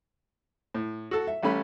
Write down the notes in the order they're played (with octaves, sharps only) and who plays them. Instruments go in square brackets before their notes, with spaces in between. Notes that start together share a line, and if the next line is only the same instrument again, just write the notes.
[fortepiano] A2
F#4 A4
E5
A1 G3 A3 C#4 B5